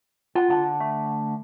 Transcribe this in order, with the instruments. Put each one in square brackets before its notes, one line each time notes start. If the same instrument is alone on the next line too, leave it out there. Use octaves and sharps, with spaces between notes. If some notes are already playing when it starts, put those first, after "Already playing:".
[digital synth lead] F4 [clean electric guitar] F#5
[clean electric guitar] D3 F#5 A5
[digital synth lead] A3